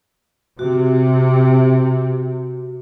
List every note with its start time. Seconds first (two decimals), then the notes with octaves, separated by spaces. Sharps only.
0.59 C3 F#4